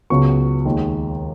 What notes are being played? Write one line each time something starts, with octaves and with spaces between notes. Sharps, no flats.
C#2 C#3 F#3 B3 C#6
D#2 D#3 G#3